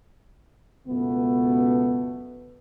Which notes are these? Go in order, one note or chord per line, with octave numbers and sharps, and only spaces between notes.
C#2 F#2 B2 A3 B3